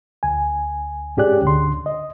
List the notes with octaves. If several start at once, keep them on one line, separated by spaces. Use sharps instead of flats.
D2 G#5
G#2 C#4 G4 G#4 D5 F#6
D2 D3 C6
D#5